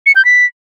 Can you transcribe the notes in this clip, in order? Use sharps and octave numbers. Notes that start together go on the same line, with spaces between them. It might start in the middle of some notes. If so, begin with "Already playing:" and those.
C#7
G6
B6